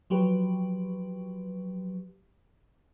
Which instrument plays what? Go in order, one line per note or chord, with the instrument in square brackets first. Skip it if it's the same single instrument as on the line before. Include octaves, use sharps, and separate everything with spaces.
[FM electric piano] F3 F#3 G4 B4